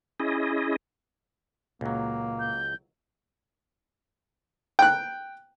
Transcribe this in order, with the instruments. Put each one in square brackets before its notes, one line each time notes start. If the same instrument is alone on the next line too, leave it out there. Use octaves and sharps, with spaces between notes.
[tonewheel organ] C#4 E4 G#4 D#5
[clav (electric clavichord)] C#2 F#3 [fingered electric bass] A#2 [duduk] A#3
[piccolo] G6
[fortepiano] G5 F#6